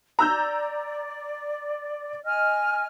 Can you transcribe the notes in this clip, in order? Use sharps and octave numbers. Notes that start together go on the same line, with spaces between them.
D5 A#5 E6 G6
D#5 G#5 F6